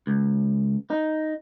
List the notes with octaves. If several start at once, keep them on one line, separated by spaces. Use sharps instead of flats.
C#2
D#4